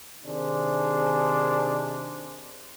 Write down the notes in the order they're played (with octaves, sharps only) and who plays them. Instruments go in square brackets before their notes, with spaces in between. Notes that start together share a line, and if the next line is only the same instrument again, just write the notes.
[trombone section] C3 D#3 D4 D#4 G#4 C5